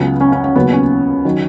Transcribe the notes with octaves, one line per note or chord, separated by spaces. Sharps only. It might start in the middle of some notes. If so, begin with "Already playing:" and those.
Already playing: C#2 C#3 F#3 B3
C#4
C#4
C#4
D#2 C#3 F#3 B3
C#4
D#3 F#3